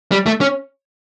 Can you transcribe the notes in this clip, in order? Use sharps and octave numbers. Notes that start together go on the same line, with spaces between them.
G3
A3
C#4